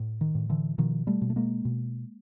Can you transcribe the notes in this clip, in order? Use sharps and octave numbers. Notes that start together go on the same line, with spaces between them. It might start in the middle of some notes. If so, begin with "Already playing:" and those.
Already playing: A2
D#3
A2
D3 E3
B2 D#3 F3
G3 A3
B2
A3
G#3 A#3
B2